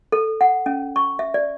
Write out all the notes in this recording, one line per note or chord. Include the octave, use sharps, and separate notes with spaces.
A4
F#5
C#4
C#6
E5
D5